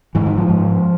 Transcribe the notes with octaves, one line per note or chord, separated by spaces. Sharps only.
G#2 E3
D#3
F3
G#2